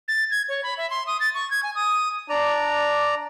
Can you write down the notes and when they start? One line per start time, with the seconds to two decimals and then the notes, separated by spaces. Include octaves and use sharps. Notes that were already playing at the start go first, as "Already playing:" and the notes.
0.08 A6
0.31 G#6
0.49 C#5
0.63 B5
0.78 E5
0.90 C6
1.07 D#6
1.20 A6
1.34 C#6
1.51 G#6
1.63 G#5
1.75 D#6
2.29 D4 D5 A#5